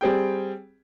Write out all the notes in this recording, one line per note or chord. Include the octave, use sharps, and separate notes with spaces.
G3 C4 G#4 G5